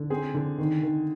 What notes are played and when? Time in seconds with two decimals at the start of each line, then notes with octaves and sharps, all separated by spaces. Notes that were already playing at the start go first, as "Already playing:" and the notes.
Already playing: D3
0.10 C4 G#4
0.34 D3
0.58 D#3
0.83 D#3